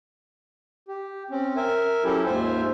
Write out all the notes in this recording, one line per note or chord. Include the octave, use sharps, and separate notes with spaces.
G4
C4 C#4
A#4 E5 G#5
F#3 C#4 E4 G4 A4
D#2 G#2 F4 C5 E5 G#5